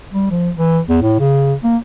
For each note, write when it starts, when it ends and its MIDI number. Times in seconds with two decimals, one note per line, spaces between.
0.13 0.27 55
0.31 0.50 53
0.56 0.79 52
0.89 1.00 40
1.02 1.18 45
1.19 1.54 49
1.63 1.77 58